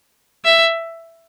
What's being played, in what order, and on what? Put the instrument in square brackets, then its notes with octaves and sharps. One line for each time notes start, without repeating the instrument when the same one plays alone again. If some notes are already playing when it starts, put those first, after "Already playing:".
[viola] E5